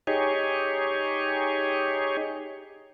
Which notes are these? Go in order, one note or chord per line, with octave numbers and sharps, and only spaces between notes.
D#4 G4 G#4 C#5